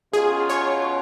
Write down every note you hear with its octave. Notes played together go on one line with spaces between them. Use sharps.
B2 F#3 C#4 F4 G#4
C#5